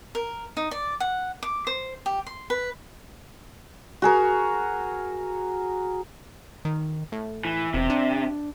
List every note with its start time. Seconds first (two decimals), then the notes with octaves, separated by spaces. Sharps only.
0.15 A#4
0.57 D#4
0.71 D5
1.00 F#5
1.43 D6
1.67 C5
2.06 G4
2.27 C6
2.50 B4
4.02 F#4 G#4 A#4
6.65 D#3
7.12 A2
7.45 E3
7.74 E1 C3
7.90 D4